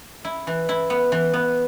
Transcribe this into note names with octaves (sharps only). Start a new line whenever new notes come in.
E4
E3
E4
B3
E3
B3